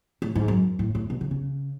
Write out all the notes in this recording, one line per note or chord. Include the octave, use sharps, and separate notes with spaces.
A2
G#2
F#2
A2
A2
B2
C#3
C#3